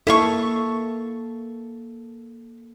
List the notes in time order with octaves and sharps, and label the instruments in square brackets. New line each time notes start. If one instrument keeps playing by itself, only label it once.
[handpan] A#3 A4 [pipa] E4 F5 C#6